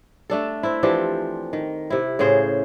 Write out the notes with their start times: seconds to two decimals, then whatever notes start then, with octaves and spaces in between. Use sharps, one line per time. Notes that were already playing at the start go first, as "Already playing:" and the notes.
0.30 A3 D4 A4
0.63 C4 E4
0.83 E3 F3 D4 G4
1.53 D#3
1.90 C3 E4
2.19 A2 C#3 G#4 C5